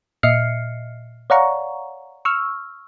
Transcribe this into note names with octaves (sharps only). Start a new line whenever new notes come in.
A#2 D#5 E5 F6 C7 C#7
C#5 D5 F5 F#5 A#5 C#6
C#6 E6 F6